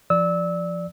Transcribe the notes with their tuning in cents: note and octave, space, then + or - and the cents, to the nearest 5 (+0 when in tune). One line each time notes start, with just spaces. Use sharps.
F3 -15 D5 +0 E6 -25